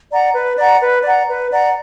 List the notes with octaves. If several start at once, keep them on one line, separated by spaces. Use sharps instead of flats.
D5 F#5 A#5
B4
D5 F#5 A#5
B4
D5 F#5 A#5
B4
D5 F#5 A#5